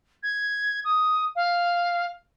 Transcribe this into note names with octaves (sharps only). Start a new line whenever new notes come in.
G#6
D#6
F5